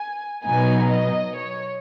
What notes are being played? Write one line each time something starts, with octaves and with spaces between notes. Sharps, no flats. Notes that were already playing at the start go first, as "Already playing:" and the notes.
Already playing: G#5
B2 F#3 B3 D#4 G#5
D#5
C#5